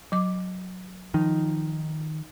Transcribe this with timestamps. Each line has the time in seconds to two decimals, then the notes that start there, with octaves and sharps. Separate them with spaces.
0.12 F#3 D6
1.14 D#3 F3 D#4